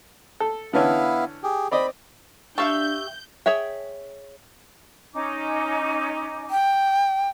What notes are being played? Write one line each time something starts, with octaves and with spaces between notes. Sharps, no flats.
A4
D3 E3 B3 C#4 E4 F5
G4 G#4
C4 D5 D#5 B5
D4 G4 E5 F5 A5 C#6 E6 G6
G#4 C#5 E5 G5
C#4 D#4 D6
G5